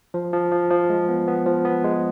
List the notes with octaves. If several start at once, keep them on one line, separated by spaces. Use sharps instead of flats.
F3
F3
F3
F3
G#3
B3
B3
F3
B3
G#3